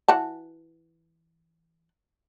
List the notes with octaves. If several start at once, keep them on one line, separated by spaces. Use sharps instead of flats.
E3 F#4 A5